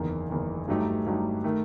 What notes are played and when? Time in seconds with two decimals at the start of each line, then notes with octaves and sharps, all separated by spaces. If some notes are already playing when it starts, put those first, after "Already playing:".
Already playing: F#1 E2 D#3
0.30 F#1 E2 D#3
0.68 G2 F#3 A3 D#4 G4
1.06 G2 F#3 A3 D#4 G4
1.44 D#3 A3